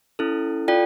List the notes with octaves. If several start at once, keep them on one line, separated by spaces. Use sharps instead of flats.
C#4 E4 A4
F4 A4 D5 G5